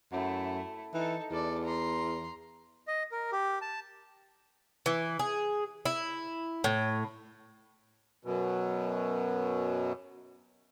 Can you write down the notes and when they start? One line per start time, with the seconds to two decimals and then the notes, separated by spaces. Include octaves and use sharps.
0.12 F#2 A3 E4
0.94 E3 D#4 A4
1.31 E2 A4 D5
1.65 A#5 C6
2.88 D#5
3.12 A#4
3.32 G4
3.62 A5
4.86 E3
5.19 G#4
5.86 E4
6.64 A2
8.25 F#2 B2